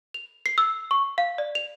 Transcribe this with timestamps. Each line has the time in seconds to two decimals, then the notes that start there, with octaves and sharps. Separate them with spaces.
0.14 F7
0.46 C7
0.58 E6
0.91 C#6
1.18 F5
1.38 D5
1.55 F7